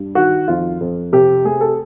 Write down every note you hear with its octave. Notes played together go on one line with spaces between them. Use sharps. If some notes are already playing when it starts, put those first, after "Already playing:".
Already playing: G2
D#3 F#4
F2 F4
F2
C3 G4
A3 G#4
A4